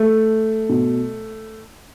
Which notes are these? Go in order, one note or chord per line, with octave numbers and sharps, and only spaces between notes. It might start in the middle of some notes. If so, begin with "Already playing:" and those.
Already playing: A3
B2